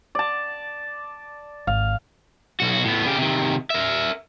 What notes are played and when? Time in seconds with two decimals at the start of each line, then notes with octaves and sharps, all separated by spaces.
0.15 D5 A5
1.67 G#1 F5
2.60 B1 F#4
2.84 A2 B3
3.06 C#3 G4
3.18 C3 D#3
3.70 A#4 E5